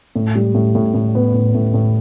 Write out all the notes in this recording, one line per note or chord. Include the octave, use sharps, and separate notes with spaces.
A2
G3
A2
A2
A2
B3
A2
A2
A2